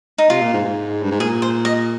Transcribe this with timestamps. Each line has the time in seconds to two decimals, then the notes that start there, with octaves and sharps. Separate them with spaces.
0.18 D#4
0.30 C3 F4
0.42 A#2
0.53 G#2
0.64 G#2
1.03 G2
1.11 G#2
1.20 A#2 G#4
1.42 C5
1.65 D#5